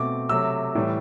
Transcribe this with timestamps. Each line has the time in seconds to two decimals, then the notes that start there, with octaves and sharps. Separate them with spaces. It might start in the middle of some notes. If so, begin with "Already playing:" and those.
Already playing: B2 A3 C4 D6
0.29 C3 F#3 A3 E6
0.75 A2 E3 G3